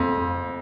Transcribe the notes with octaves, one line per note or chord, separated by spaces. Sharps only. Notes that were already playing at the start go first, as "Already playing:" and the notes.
Already playing: F2